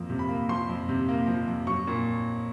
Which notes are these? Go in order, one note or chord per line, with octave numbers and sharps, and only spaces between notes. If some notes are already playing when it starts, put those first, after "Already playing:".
Already playing: F2 F3 A#3
C3
B5
A#3
F3 C6
F2
C3
A#3
F3
F2
F#3 C#6
A#2